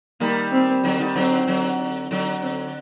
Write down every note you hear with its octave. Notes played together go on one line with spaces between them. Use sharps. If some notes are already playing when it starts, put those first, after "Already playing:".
D#3 G3 A#3
C4
D3 F#3
D#3 G3
D3 F#3 C4
D3 F#3
D3 F#3
C4